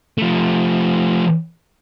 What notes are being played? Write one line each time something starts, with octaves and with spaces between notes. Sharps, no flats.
F3 A3